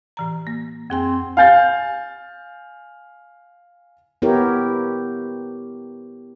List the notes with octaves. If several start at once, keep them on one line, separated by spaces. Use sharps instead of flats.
A2 E3 A#5
A#3
F2 C4 G#4 G#5
F5 G#5 G6 A6
B3 E4 G4 A#4 C#5